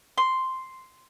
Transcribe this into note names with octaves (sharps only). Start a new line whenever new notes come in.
C6